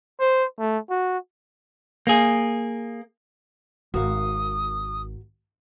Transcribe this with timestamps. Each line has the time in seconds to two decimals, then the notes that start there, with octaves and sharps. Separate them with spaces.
0.20 C5
0.59 A3
0.90 F#4
2.07 A#3 G#4
3.94 G#1 C4 F#4 A#4 F5 D#6